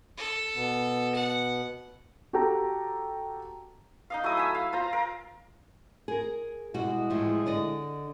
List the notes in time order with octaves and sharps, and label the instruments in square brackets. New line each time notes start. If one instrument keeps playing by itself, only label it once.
[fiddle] A4
[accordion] B2 B3
[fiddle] F#5
[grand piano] F#4 G4 A4 G5 A#5
[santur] D#4 D#5 F5
F#3 A3 E4 D#6
E5 G#5
F5
F4 C5 A#5
A#4
[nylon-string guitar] G#4 A#4
[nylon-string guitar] B2 G3 F#4 [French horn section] G#3 E4
[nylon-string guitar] E2 A2 F3
D3 D5 D#5